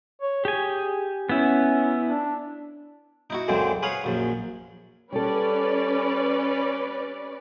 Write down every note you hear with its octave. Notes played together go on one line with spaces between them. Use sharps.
C#5
G4 G#4 G#5
B3 C#4 E4
D4
D#4 E4 F#4
C#2 F#2 D3 E3 C4
G#4 B4 C#5 F5 F#5
A#1 F#2
G3 C#4 A4 B4 D5